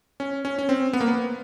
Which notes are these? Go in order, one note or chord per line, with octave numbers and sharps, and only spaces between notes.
C#4
C#4
C#4
C4
B3
A#3
B3